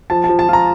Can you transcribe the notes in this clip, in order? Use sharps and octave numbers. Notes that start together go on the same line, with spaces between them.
F3 A5
A5
F3
A5
F4 A#5